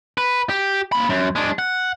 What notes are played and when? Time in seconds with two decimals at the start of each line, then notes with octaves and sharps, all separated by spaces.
0.18 B4
0.49 G4
0.92 A#3 B5
1.09 F#2
1.36 G#3 D4
1.59 F#5